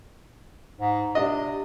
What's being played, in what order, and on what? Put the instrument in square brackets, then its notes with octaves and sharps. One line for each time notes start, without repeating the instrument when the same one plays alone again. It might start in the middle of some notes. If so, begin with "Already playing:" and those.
[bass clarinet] G#2
[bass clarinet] C3 [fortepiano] D4 D#5